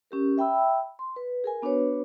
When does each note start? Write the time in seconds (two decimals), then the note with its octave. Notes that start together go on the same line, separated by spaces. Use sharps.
0.11 C#4 G4 A#4
0.38 E5 G5 B5 E6
0.99 C6
1.16 B4
1.44 G#4 A#4 G#5
1.62 B3 D4 F#4 B4 C#5